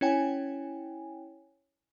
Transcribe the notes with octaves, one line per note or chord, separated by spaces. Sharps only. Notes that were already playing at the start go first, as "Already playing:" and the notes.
C#4 E4 C#5 G5 G#5